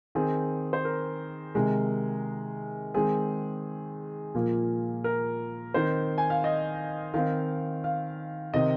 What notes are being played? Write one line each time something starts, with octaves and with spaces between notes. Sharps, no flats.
D#3 C4 G#4
C5
A#4
C3 D#3 G#3
D#3 G#3 C4 G#4
A#2 F3 A#3
A#4
D#3 C4 C5
G#5
F5
D#5
D#3 C4 F5
F5
C3 D#3 C4 D#5